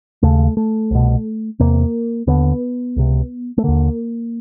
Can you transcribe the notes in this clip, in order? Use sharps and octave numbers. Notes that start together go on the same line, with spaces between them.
D#2 C#3 A3
A3
C2 B2
E2 C3 A#3
D#2 D3 B3
C#2 C3
A3
D#2 D3 A#3